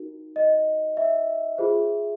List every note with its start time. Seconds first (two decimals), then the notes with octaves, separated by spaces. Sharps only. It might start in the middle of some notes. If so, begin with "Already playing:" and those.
Already playing: D#4 F#4 A#4
0.36 D#5
0.97 E5
1.58 F4 G#4 C5